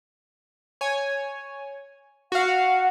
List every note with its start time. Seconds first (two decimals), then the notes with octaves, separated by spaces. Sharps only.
0.81 C#5 G#5
2.32 F#4 F5 F#5